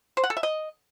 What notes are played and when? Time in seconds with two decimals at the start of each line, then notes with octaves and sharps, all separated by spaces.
0.17 C5
0.24 F#5
0.30 A4
0.37 E5
0.43 D#5